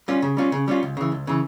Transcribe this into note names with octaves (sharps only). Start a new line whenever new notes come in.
G3 C#4 F4
C#3
G3 C#4 F4
C#3
G3 C#4 F4
C#2
C#3 E3
C#2
C#3 E3